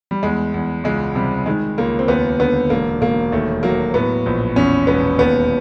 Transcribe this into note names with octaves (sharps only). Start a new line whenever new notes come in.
G3
E2 G#3
E2
C#2 G#3
C3 G3
D#3 G#3
C#2 A#3
C4
D#2 B3
D3 B3
E1 A#3
E1 A#3
D#2 A3
F#3 A#3
A2 B3
A#1
E2 C#4
E1 B3
D#2 B3